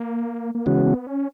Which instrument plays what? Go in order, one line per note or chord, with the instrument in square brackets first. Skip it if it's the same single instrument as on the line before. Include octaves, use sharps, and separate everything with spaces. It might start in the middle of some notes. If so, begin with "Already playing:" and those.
Already playing: [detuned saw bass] A#3
A#3
[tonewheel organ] C#3 E3 G#3 C#4 F#4 [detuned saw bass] B3
[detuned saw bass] B3
C#4